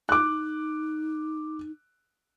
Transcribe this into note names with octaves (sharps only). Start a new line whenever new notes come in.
D#4 D6 F#6